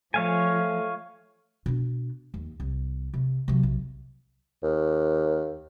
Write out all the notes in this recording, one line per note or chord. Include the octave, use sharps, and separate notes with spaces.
F3 A3 C#5 F5 G#5
B2 D4
D#2
C2
C3
C3 F#3
B1
D#2